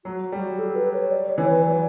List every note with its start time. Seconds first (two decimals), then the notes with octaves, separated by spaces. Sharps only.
0.05 F#3 F#4
0.32 G3
0.59 A4
0.75 B4
0.93 C#5
1.11 D5
1.29 C#5
1.38 E3
1.47 B4
1.63 F#3 D5